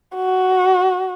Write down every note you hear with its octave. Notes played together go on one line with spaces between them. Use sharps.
F#4